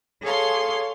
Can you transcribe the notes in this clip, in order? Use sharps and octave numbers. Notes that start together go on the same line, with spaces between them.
G#4 A4 C#5 F5 C6